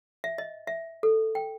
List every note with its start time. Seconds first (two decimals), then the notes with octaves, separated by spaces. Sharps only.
0.24 E5
0.38 D#5
0.67 E5
1.03 A4
1.35 G5